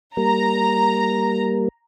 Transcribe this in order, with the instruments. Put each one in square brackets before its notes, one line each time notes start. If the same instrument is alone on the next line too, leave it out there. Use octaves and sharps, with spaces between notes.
[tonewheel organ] G3 A#3 [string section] A#5